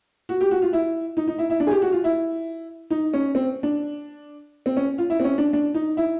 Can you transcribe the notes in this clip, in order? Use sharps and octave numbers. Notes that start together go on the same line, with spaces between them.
F#4
G4
F#4
F4
E4
D#4
D#4
E4
E4
D4
G#4
G4
F#4
F4
E4
D#4
C#4
C4
D4
C4
C#4
F4
E4
C4
C#4
D4
D4
D#4
E4